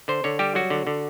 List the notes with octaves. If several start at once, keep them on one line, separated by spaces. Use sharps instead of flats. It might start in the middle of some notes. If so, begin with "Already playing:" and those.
D3 C5
D3 C#5
G3 G4
F#3 F#4
D3
D3